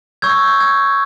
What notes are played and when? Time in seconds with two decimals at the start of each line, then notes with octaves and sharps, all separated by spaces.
0.22 C#6 E6 G6 G#6
0.60 G#6